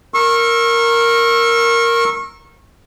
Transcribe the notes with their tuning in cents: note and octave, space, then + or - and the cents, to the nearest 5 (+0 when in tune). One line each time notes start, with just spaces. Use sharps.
A#4 -5 C#6 -30 E6 +0